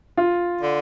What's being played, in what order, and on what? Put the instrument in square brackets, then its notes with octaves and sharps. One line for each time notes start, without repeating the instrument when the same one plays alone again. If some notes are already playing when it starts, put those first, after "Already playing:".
[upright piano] F4
[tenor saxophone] D3